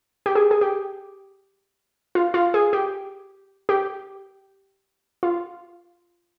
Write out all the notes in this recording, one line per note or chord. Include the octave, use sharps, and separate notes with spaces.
G4
G#4
G#4
G4
F4
F4
G#4
G4
G4
F4